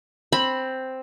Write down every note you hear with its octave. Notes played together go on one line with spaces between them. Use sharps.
C4 B5